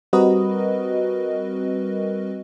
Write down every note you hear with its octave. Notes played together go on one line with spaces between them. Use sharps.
G3 C4 F#4 A#4 B4 D#5